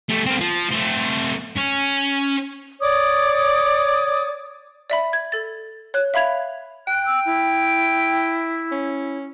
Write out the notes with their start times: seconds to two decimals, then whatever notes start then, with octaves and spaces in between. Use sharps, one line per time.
0.09 A3 G4
0.26 C4 A#4
0.40 F3
0.71 A3 C4
1.56 C#4
2.81 C#5 D5 D6 D#6
4.90 D5 E5 B5
5.13 G#6
5.32 A4 A6
5.94 C#5 F#6
6.14 E5 F5 B5 G#6 F7
6.88 G5 F#6
7.06 E6
7.26 E4
8.72 C#4